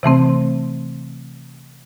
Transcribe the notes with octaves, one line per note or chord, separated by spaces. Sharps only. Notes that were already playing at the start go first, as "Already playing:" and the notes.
C3 E3 A3 C4